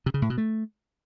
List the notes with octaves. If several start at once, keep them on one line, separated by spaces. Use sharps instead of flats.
C3
C#3
A2
B2
A3